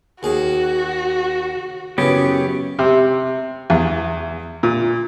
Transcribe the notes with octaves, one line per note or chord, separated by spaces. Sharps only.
D#2 F#4 G#4
F#2 C#3 E3 B3 G4 C#5
C3
E2
A#2